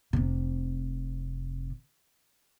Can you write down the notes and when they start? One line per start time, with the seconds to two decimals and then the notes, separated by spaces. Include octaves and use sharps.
0.13 F1 C3